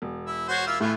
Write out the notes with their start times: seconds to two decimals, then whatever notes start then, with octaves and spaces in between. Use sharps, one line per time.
0.02 E1
0.26 E4
0.49 F#4 C5 C#5
0.67 A#3 E4 F4
0.80 A2 E3 A3 F4 E5